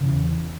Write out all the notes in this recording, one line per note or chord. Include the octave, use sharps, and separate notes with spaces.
E2 C#3 E3